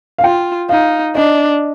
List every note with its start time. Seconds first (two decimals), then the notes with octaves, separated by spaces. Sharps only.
0.18 F5
0.23 F4 G5
0.69 D#4 F5
1.15 D4 D#5